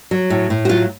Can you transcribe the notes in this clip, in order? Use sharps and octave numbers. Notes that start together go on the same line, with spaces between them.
F#3
A2
A2
F#4
F#3 F4